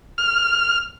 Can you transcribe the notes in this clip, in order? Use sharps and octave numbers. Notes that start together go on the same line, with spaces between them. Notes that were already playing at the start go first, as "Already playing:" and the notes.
F6